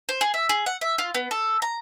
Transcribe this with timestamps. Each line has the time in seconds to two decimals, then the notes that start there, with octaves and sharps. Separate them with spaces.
0.09 C5
0.21 G#4
0.34 E5
0.49 G#4
0.66 F#5
0.81 E5
0.98 F4
1.15 B3
1.31 A4
1.62 A#5